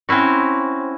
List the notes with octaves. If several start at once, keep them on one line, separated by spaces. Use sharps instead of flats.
C4 C#4 E4 F#4